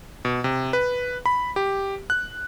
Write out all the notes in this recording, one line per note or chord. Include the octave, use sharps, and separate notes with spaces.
B2
C3
B4
B5
G4
F#6